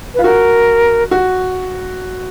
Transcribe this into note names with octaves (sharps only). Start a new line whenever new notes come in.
F4 B4
F#4 A#4
F#4